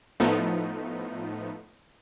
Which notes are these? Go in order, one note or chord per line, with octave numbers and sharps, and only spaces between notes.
A2 F3 A3 B3 D#4